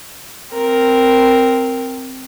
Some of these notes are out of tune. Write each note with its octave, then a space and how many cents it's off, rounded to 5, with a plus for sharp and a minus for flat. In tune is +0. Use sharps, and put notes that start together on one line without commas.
C4 +0 A#4 +0